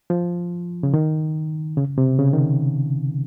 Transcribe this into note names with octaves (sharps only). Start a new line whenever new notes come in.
F3
C#3
D#3
C#3
C3
C#3
D#3